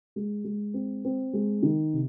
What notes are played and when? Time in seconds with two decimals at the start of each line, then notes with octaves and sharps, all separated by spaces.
0.16 G#3
0.44 G#3
0.74 C4
1.05 C4
1.33 G#3
1.63 D#3
1.93 C3